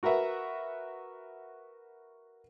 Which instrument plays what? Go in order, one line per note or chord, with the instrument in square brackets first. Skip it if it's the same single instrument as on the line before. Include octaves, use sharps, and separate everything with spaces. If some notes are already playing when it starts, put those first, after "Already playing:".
[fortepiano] F#4 A#4 B4 E5 F#5